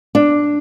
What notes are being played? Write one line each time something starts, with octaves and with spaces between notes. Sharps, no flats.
D4